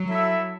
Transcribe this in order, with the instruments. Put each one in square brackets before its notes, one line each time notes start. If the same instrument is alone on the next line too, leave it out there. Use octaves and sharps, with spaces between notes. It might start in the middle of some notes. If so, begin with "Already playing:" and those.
Already playing: [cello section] F#3
[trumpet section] E4 A4 E5